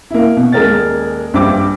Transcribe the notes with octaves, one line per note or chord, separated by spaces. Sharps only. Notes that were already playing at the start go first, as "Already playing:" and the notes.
A#3 E4
B2
D#1 G#3 A#4 A6
A#1 G2 G3 C5 D6